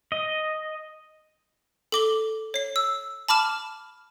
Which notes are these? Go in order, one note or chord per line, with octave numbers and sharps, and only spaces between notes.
D#5
A4 D6 G7
C#5 C7
E6
A5 B5 D6 F6 E7